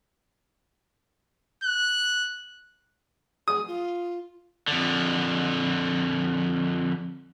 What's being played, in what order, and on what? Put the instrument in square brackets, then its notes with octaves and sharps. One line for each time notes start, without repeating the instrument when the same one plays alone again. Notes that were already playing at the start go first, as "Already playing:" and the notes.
[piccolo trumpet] F#6
[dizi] G#4 [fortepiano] D#6
[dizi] F4
[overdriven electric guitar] F2 D3